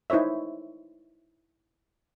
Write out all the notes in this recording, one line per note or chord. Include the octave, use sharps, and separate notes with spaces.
D#4 E4 C5 C#5 E5